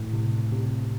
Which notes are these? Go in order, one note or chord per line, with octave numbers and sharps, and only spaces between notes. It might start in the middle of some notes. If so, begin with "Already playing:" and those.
Already playing: A2
C3
C3